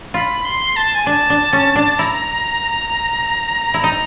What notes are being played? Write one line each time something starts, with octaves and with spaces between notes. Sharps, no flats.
F4 B5
C6
A5
G#5
D4 A5
D4
C#4
D4
E4 A#5
E4
D#4 A#5